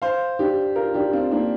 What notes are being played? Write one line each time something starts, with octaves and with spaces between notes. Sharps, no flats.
C5 F5
D4 G4
F4 A#4
D4 G4
C4 F4
A#3 D4